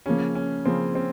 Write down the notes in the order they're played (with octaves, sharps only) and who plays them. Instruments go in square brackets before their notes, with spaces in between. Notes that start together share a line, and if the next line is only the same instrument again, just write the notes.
[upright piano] C#3 F3 A#3 [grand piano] C#4
[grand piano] C#4
[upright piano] C#3 F3 A#3 [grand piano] C4
[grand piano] C4